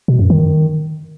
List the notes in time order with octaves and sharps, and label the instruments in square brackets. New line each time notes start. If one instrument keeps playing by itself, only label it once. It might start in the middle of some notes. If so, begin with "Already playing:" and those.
[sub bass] B2
F#2
D#3